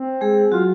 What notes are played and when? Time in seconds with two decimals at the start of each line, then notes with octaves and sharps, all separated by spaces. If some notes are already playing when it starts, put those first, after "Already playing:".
Already playing: C4
0.21 G#3 G#4
0.51 F#3 F4 F#4